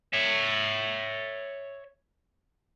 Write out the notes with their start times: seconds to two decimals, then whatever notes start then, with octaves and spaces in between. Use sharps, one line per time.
0.13 C#5 E5